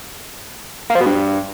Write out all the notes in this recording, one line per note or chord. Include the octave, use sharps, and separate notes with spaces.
A#3
F3
B2
G2